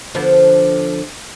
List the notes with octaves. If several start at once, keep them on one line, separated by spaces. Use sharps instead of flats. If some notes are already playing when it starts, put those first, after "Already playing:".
D3 F3 B3